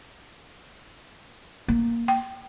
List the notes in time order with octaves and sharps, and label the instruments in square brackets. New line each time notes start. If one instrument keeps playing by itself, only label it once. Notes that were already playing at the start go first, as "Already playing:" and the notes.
[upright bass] A#3
[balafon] G5